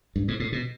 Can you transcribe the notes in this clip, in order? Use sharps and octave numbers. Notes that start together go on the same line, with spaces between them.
G2
G#2
A2
B2